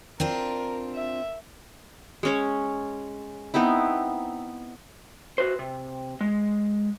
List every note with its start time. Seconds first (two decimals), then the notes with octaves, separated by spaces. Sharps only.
0.20 C4 D4 F4 A#4
0.95 E5
2.23 G#3 C#4 C#5
3.54 B3 C4 D#4 E4
5.38 F#4 B4 C5
5.59 C3
6.21 G#3